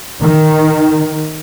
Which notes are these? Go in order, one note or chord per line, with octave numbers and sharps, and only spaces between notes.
D#3